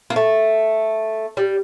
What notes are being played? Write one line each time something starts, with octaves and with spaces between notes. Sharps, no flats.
A#3
A3
G3